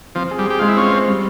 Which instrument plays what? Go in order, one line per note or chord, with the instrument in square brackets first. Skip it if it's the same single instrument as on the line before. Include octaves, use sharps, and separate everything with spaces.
[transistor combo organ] F3 [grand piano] C4
[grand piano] G#4
[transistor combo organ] G3
[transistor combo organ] G4 [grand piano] G#4
[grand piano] G#3 [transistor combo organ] F4
[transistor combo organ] E4
[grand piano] C4 [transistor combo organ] C#4 F4
[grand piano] C4
G3